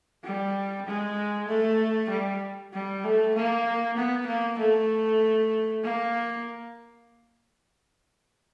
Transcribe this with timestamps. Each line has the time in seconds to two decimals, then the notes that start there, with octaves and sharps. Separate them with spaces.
0.24 G3
0.86 G#3
1.49 A3
2.10 G3
2.73 G3
3.04 A3
3.35 A#3
3.97 B3
4.27 A#3
4.59 A3
5.83 A#3